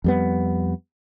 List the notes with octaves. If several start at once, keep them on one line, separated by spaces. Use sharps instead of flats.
F2 G3 B3